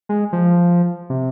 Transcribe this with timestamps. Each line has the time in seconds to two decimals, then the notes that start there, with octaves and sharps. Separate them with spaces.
0.09 G#3
0.33 F3
1.10 C3